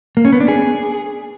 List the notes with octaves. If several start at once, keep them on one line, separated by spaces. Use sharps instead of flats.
A#3
C#4
B3
D4
G#4